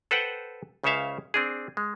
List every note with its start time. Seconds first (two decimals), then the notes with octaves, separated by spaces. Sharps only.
0.11 A4 B4 C5 F#5 G5
0.84 C#2 C#3 C5 C#5 E5 F5
1.34 C4 D4 G#4
1.77 G#3